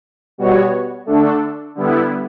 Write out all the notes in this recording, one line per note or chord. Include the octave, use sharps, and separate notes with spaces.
B2 G3 B3 F#4 C#5
D3 A3 D4 A4
D3 G3 B3 E4